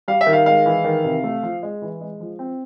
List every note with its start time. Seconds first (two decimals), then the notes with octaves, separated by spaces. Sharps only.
0.08 G3 F5
0.21 E5
0.26 D#3
0.33 F5
0.46 G#3 F5
0.66 E3
0.84 D#3
1.04 C3
1.24 A3
1.43 F3
1.63 G#3
1.82 E3
2.01 G#3
2.20 F3
2.39 C4